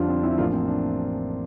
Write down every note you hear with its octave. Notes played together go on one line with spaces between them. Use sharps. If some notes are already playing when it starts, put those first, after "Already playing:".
Already playing: F2 D3 G3 D4 F4
C4
C4 E4
A1 A2 F3 A#3 D4 F4
C4
D4